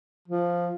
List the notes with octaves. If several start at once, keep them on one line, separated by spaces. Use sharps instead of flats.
F3